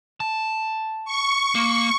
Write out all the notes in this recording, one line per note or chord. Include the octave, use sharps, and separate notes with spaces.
A5
C#6
A#3